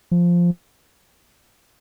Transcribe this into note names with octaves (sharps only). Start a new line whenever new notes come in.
F3